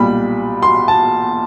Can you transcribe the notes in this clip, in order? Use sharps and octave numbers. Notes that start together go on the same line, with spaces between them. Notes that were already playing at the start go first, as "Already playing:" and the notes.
Already playing: B1 A#2 G3 B5
C6
A5